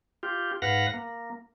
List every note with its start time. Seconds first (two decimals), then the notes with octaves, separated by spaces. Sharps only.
0.23 F4 G4
0.62 G#2 B4 F5 F#5 A#6
0.94 A#3